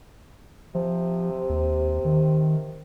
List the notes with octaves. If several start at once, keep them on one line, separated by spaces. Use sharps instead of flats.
C3 F3
D#2
D#3